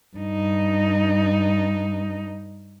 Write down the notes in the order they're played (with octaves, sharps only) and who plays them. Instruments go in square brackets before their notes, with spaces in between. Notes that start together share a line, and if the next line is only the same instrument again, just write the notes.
[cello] G2 D#4